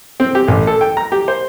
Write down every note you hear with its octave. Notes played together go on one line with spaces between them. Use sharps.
C4
G4
A1
A4
G5
A#5
G4
C5